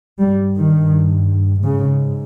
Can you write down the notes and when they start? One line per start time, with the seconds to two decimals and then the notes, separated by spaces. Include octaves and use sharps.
0.21 G2 G3
0.57 D#3
1.64 G#2 C#3